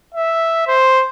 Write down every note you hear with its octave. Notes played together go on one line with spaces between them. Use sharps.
E5
C5